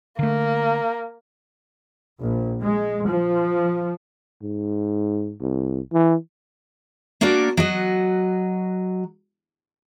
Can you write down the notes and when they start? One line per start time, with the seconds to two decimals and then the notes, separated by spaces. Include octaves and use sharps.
0.19 D3 A3 A#3
2.20 A#1
2.60 G#3
3.06 F3
4.42 G#2
5.41 C2
5.93 E3
7.21 A#3 D4 F#4 A#4 D5
7.57 F#3 F#4 D#5